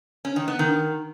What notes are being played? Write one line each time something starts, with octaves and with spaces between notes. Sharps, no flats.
C#4
D#3
B3
D#3